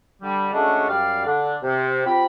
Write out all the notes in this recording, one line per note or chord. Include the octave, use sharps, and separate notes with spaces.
D3 G3
C#3 G#3 A3 C#4 D4 F#4
F#2 G3 G4 D5 F5
D3 D4
C3
C4 F4 G4 B5